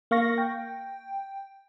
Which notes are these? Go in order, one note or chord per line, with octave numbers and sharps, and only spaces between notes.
A#3 F5 C#6 A#6
G5